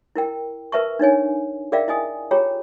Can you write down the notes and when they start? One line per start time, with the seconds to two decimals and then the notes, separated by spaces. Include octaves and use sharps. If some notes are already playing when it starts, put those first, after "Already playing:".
0.15 E4 A#4 G5
0.72 A#4 B4 E5 A5 C#6
0.99 D4 D#4 C#5 G#5
1.72 G#4 A#4 D5 E5 F5 G5
1.88 E4 D#5 G#5 D#6
2.31 F4 G4 G#4 C#5 G5 A#5